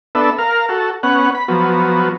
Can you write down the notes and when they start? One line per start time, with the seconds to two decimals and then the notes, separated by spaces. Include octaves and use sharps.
0.15 B3 D4 A4 E5
0.38 A#4 F5
0.69 F#4 A4
1.03 B3 C#4 F#5
1.35 B5
1.48 F3 F#3 B3